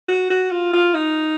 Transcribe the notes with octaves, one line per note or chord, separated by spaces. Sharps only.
F#4
F#4
F4
F4
D#4